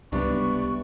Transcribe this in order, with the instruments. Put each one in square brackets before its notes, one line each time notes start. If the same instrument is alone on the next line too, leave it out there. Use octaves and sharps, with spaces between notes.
[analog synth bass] C#2 [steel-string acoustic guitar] C3 G3 [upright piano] B3 D4 [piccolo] C#6